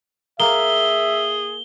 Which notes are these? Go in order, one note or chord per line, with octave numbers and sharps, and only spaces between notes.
A#3 G#4 E5 G7